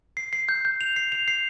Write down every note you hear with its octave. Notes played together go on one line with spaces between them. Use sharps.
C7
C7
G6
G6
F7
C7
F7
C7